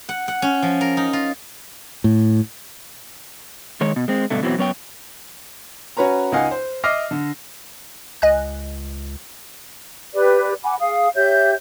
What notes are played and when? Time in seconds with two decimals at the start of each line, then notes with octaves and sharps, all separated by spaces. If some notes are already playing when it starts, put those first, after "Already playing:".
0.09 F#5
0.28 F#5
0.42 C#4
0.62 F3
0.81 A#4
0.97 D#4
1.13 F4
2.04 A2
3.81 D#3 G#3 C#5
3.96 B2
4.08 G#3 C4
4.30 G2 B2 D3 A3
4.42 E2 B2 E3 F#3 C4
4.58 F#2 B3 C#5 G5
5.97 C#4 F#4 B4 C#5 A#5
6.32 C#2 D#4 D#5 F5 F#5 G#5
6.51 C5
6.84 D#5 E5 D6 F6 A#6 C7
7.11 D3
8.22 C#2 D#5 G#5 F#6
10.13 G4 B4 D5
10.63 F#5 G#5 B5 D6
10.80 G#4 F5 D#6
11.15 G4 C#5 E5 G6